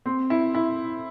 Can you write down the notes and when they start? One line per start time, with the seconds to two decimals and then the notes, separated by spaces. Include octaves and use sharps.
0.06 C4
0.30 E4
0.55 E4